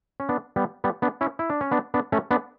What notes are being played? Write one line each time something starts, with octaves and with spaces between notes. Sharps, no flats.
C#4
B3 D4
G3 B3
G3 B3
B3 D4
C#4 E4
E4
D4
C#4
B3 D4
B3 D4
A3 C#4
B3 D4